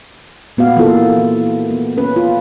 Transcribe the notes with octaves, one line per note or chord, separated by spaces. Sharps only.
A#2 B3 F#4 F5
E3 A#3 B3 E4 F4 A4
E3
B3
C#4 B4
F4